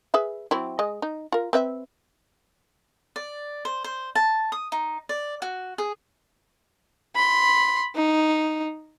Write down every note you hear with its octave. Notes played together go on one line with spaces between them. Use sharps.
G#4 B4 E5
F#3 C4 E4
G#3 D#5
D#4
F4 A#4
C4 B4 E5
D5
C5
C5
A5
D#6
D#4
D5
F#4
G#4
B5 C6
D#4